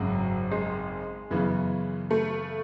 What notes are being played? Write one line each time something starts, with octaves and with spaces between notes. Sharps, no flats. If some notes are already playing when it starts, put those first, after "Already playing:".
Already playing: G#1 F#2 C#3 F#3
G#3
F#2 C#3 E3 B3
A3